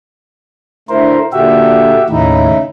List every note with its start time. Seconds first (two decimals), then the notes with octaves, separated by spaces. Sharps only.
0.89 D3 A3 E4 A#4 C5
1.33 A#2 D3 F#4 G4 E5
2.10 D#2 A2 C#3 D#4 E4